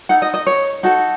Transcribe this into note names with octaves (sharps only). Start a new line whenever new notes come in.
D#4 A4 F#5
D#5
D#5
C#5
D#4 F#4 A4